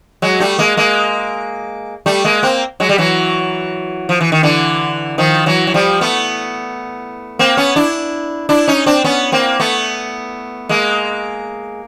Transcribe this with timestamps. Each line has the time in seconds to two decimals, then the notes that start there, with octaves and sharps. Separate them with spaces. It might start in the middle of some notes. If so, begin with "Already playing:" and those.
0.22 F#3 G#3
0.40 G3 A3
0.59 G#3 A#3
0.77 G#3 A#3
2.06 G3 A3
2.24 G#3 A#3
2.43 A#3 C4
2.80 F#3 G#3
2.89 G3
2.98 E3 F#3
4.09 F3
4.21 E3
4.32 D#3
4.43 D3 E3
5.18 D#3 F3
5.46 E3 F#3
5.67 F#3
5.74 F3 G3
6.01 A3 B3
7.39 A#3 C4
7.57 B3 C#4
7.76 D4 E4
8.49 D4 E4
8.68 C#4 D#4
8.86 C4 D4
9.04 B3 C#4
9.32 A#3 C4
9.60 A3 B3
10.69 G#3 A#3